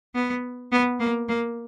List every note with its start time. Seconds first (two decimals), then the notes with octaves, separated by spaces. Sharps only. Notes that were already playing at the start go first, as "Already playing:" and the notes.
0.15 B3
0.72 B3
1.00 A#3
1.28 A#3